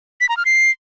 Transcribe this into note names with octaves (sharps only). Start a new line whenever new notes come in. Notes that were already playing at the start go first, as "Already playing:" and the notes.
B6
A#5
F6
C7